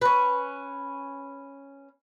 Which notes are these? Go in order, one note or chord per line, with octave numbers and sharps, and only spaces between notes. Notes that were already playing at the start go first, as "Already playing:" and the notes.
C#4 B4